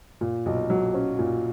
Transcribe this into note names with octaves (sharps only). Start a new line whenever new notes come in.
A#2
B1
F#3
C#4
A#2